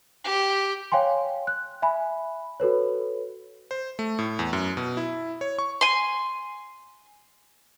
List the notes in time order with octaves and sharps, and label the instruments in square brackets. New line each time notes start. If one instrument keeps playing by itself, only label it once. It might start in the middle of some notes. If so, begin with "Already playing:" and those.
[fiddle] G4
[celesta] C#5 F5 G5 G#5 C6
F#6
E5 G#5 B5
F#4 A4 B4 C#5
[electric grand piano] C5
A3
A2
E2
F#2
B2
E4
C#5
C#6
[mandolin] G#5 C6